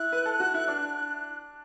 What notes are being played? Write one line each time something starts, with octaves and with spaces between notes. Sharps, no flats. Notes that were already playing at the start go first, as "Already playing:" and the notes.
Already playing: E4 F#6
B4
A4
F#4
E4
D4